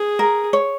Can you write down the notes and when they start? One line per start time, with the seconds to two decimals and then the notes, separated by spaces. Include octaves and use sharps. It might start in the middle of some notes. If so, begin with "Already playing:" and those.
Already playing: G#4
0.19 A#4
0.53 C#5